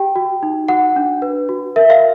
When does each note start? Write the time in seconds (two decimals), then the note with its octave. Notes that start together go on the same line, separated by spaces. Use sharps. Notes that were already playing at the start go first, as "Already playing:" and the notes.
Already playing: G4 G5
0.15 F#4
0.43 D#4
0.68 F#4 F#5
0.96 D4
1.22 B4
1.49 F#4
1.76 A#4 E5
1.90 F5